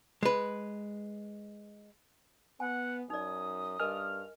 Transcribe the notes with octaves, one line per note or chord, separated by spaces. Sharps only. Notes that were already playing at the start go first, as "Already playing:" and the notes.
G#3 B4
B3 F#5 G#5
F#2 D#4 D5 D#6
G2 A#4 D#5 G#5 F6